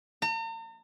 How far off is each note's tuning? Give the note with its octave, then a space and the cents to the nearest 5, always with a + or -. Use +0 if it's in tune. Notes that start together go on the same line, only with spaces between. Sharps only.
A#5 -45